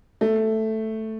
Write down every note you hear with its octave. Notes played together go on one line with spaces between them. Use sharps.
A3